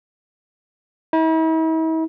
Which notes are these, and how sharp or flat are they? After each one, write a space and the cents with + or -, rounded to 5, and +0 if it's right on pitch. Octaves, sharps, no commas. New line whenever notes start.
E4 -45